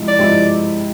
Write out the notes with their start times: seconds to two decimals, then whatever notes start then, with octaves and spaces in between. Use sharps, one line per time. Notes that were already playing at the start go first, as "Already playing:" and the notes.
Already playing: C3 F3 G#3 E4
0.08 D5
0.19 C3 F3 G#3 C4 E4